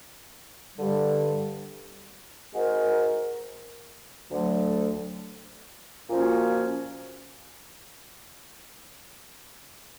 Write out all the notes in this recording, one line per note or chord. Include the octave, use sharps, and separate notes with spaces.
G2 D3 G3
G#3 C4 D#4 F#4 A#4
D2 D3 F#3 A3
A#2 F3 A#3 C#4 F#4